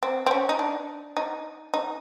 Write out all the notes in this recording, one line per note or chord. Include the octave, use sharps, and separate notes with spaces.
C4
C4
C#4
D#4
D4
D#4
D#4